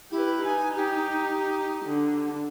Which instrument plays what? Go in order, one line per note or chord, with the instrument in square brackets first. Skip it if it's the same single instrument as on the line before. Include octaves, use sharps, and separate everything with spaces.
[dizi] E4 [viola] G4 B4
[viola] D#4 [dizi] G#5
[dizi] G4
[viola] D3